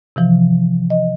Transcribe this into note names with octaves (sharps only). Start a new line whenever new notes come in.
C3 E3 F3
D#5